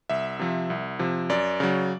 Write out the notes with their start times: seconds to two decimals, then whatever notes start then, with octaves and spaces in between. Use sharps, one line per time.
0.10 C2 E5
0.39 C3 F3
0.70 C2
0.99 C3 F3
1.29 F#2 D5
1.60 C#3 F#3